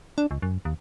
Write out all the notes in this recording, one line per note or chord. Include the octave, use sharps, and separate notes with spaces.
D4
C#2
F#2
D#2